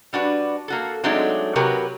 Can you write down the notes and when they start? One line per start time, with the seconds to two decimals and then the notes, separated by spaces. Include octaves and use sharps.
0.13 G3 D4 F#4 B4
0.68 A#3 F#4 A4
1.04 F#3 G#3 A3 C4 D4 D#4
1.56 C3 F#3 F#4 G4 A#4 B4